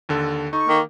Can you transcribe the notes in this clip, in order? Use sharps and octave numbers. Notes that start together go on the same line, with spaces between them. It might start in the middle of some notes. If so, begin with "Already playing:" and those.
D#2 D3 A4
D#4 A4 C#6
D#3 A#3